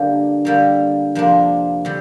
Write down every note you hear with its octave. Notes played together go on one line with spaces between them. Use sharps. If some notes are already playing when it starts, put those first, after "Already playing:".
Already playing: D3 G3 A#3 D4
D3 G3 A#3
F2 C3 A#3 D4
D3 G3